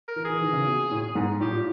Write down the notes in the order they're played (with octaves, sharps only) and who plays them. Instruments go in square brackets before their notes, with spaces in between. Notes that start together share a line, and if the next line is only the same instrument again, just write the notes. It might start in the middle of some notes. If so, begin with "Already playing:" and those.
[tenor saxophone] A#4
[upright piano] E3
[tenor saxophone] G#4
[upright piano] E3
D#3
C#3
B2
A2
G#2
[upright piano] A2 [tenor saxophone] G4
[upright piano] A#2